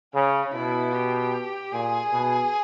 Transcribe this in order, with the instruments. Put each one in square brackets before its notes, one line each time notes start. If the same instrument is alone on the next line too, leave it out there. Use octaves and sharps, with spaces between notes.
[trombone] C#3 [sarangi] C#4
[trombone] B2 [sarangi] E4
[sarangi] G4
[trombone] A#2 [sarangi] G#4
[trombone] B2